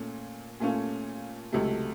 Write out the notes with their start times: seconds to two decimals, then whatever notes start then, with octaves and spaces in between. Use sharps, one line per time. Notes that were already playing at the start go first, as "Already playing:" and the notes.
Already playing: A#2 A3 C#4
0.60 A#2 A3 C#4 F4
1.53 C#2 C3 F#3 A3